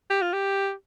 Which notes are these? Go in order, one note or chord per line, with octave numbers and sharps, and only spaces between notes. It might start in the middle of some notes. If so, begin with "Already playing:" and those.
G4
F4
G4